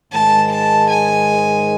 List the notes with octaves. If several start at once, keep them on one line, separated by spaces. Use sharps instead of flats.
G#2 D#3 G#3 A5
A5
G#5